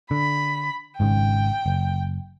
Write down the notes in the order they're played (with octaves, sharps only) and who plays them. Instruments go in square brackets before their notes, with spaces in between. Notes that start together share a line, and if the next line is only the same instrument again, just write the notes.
[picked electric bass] D3 [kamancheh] B5
[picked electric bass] G#1 G#2 C#3 [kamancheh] G5
[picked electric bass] F#1